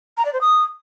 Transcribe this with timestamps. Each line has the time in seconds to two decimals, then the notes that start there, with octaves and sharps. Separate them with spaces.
0.17 A#5
0.25 D5
0.33 C5
0.41 D#6